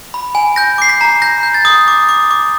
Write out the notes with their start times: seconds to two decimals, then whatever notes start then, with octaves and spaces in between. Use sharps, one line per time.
0.14 B5
0.35 G#5
0.56 G6 A#6
0.78 D6 C7
0.89 B6
1.01 A#5
1.22 G6 A#6
1.43 G6
1.54 A6
1.65 D#6
1.88 D6
2.09 D6
2.31 D6